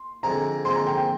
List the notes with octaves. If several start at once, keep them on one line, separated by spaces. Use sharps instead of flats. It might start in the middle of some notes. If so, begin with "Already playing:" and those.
Already playing: C6
F2 D3 G#3 C4 A#5
F2 D3 G#3 C4 C6
A#5
G5
G5